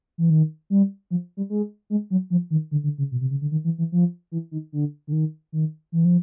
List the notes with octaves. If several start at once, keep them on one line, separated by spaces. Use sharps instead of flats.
E3
D#3
G3
F3
G3
G#3
G#3
F#3
F3
D#3
D3
D3
C#3
B2
C3
C#3
D3
D#3
E3
E3
F3
E3
D#3
D3
D3
D#3
D#3
E3
F3